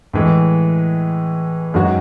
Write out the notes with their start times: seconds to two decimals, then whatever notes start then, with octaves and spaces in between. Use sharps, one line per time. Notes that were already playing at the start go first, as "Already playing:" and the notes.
0.14 A2 E3 G#3
1.74 F#2 D#3 G#3 D#4 F#4